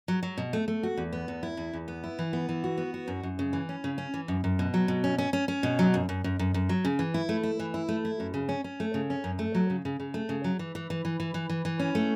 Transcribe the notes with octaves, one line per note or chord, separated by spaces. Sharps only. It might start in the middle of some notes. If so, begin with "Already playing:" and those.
F#3
F#3
B2
A3
A3
F#4
E2
B3
E2
E4
E2
E2
B3
E4
E3
B3
E3
F#4
B3
F#4
F#2
F#2
C#3
E3
C#4
C#3
C#4
E3
F#2
F#2
B2
F#3
B2
C#4
C#4
C#4
C#4
B2
F#3
F#2
F#2
F#2
F#2
F#2
F#3
C#3
E3
E4
A3
E4
E3
E4
A3
E4
F#2
C#3
C#4
C#4
A3
C#3
C#4
F#2
A3
F#3
C#3
C#3
C#3
A3
C#3
F#3
E3
E3
E3
E3
E3
E3
E3
E3
C#4
A3